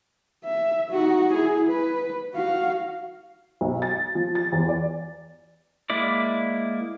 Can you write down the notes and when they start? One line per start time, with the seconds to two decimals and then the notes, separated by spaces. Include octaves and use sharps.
0.44 E5
0.91 D#4 F#4
1.32 E4 G#4
1.69 B4
2.34 F#4 F5
3.61 B1
3.82 A6
4.15 F3
4.35 A6
4.52 E2
4.69 D5
5.90 G#3 A#3 E4 D5